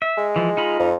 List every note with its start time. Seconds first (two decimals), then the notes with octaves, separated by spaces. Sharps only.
0.02 E5
0.17 G#3
0.36 E3 F3
0.57 D#4 F4 B5
0.80 F2